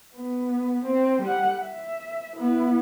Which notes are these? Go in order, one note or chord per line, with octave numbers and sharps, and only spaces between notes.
B3
C4
G3 F#5
E5
B3 E4